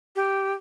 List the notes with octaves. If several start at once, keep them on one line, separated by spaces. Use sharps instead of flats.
G4